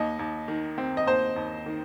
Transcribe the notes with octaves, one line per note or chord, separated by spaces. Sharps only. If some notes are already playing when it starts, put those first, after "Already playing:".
Already playing: D#2 D#5
D#2
D#3
C4
D#5
D#2 C5
D#2
D#3